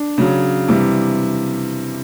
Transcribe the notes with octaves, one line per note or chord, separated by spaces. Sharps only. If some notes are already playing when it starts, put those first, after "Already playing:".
Already playing: D4
C#3 F#3
C3 E3 G3